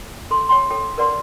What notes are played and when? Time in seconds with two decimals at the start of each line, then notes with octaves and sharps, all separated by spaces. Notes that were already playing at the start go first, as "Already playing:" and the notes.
0.31 A4 C6
0.49 C#5 G5 C6
0.70 A4 C#5 G5
0.98 A#4 B4 D5 F#5 C6